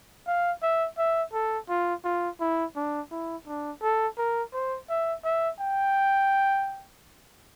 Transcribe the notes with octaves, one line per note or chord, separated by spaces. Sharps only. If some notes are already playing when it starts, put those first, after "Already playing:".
F5
E5
E5
A4
F4
F4
E4
D4
E4
D4
A4
A#4
C5
E5
E5
G5